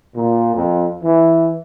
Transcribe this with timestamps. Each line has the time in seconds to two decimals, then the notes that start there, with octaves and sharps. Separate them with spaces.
0.16 A#2
0.55 F2
1.02 E3